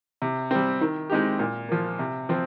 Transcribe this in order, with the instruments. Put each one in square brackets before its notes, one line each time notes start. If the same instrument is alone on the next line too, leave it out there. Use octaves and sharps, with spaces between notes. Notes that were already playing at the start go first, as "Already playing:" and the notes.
[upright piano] C3
G3 C4
D#3
G#3 C4 D#4 G4
A#2
F3 A#3
C3
F3 C4